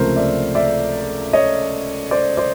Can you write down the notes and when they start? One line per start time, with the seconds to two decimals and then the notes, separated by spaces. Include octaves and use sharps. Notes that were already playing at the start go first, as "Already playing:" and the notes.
Already playing: C#2 C3 F3 A3 A#4 C5
0.16 D5 E5
0.55 D5 E5
1.33 C#5 D#5
2.11 C5 D5
2.37 C5 D5